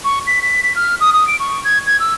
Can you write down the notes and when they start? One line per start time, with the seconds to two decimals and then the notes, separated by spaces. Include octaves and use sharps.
0.04 C#6
0.27 B6
0.42 B6
0.63 B6
0.76 F6
1.01 D#6
1.14 D#6
1.27 D7
1.40 C#6
1.64 G#6
1.87 G#6
2.00 E6